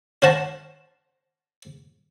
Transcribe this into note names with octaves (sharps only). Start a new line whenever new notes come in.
C#4 C5 F#5 A5 A#5